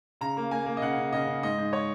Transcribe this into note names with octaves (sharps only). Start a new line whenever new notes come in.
C#3 A#5
A#3
A#3 G#5
A#3
D#5
C#3 F#5
C#3
C#3 D#5
C#3
G#2 D#5
G#2
C#5